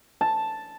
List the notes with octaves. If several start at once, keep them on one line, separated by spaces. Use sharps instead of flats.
A5